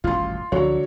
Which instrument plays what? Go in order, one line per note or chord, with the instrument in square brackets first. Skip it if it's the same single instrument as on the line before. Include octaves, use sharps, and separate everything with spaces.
[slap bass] D#1 A1 F#2 [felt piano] F4 C6
[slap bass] C#2 F3 [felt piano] D3 F#3 C#5